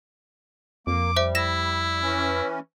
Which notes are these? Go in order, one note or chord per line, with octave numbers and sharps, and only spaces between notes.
F2 A#3 D6
G3 C5 E5
E4 A#6 E7
E3 C#4